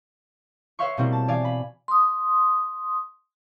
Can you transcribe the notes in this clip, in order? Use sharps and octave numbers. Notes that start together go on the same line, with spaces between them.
B4 C#5 E5 F5 C6 C#6
B2 G3 A#3 C4 E4
A5
E3 D5 F5 G#5
B5
C6 D#6